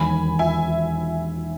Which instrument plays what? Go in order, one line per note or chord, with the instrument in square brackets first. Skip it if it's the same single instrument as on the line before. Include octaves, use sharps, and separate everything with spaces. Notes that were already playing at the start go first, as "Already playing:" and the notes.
Already playing: [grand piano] E1 D#2 D#3 F#3 [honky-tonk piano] G#5 B5
[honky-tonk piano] E5 G#5